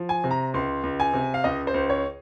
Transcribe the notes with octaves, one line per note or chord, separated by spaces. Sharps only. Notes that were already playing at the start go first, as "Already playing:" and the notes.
Already playing: F3
G#5
C3
A#5
C#2 C6
C#2
G#5
C3
F5
C#2 D#5
C5
C#2
C#5